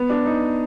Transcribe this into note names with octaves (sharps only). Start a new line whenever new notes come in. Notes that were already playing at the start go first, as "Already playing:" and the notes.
Already playing: B3
D4
D#4